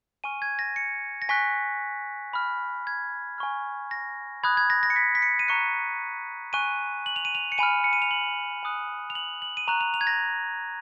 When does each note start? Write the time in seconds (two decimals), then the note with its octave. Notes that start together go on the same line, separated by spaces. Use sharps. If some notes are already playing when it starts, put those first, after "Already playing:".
0.24 G#5 C#6 F6 D#7
0.42 G#6
0.59 A#6
0.76 C#7
1.22 A#6
1.29 G#5 C#6 F#6 B6
2.33 B5 F6
2.87 G#6
3.38 G#5 C#6 F6
3.91 A#6
4.44 B5 D#6 F#6 G#6
4.57 G#6
4.70 A#6
4.83 A#6
4.90 C#7
4.96 B6
5.15 B6
5.22 C#7
5.39 D#7
5.48 A#5 C#6 F#6 C#7
6.53 G#5 C#6 F#6 D#7
7.06 F#7
7.16 F7
7.25 D#7
7.35 F7
7.52 C#7
7.58 G#5 B5 F6 D#7
7.84 C#7
7.93 D#7
8.02 F7
8.11 F#7
8.63 G#5 D#6 F#6
9.10 F7
9.15 F#7
9.42 F#7
9.57 D#7
9.67 A#5 C#6 F#6 F7
9.81 F7
9.94 F7
10.01 G#6
10.07 A#6